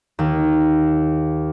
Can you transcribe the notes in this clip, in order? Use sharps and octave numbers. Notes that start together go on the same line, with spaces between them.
D#2